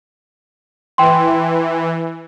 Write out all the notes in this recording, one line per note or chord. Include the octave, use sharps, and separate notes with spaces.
E3 G5 C6